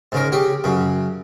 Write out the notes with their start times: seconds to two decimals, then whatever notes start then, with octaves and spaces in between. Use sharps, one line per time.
0.12 G#2 C#3 A#4
0.32 C#3 G4
0.64 F#2 C#3